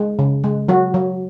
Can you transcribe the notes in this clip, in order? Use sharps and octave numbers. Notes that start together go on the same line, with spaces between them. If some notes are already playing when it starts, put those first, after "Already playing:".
Already playing: G#3
C#3
G#3
F#3 F#4
F#3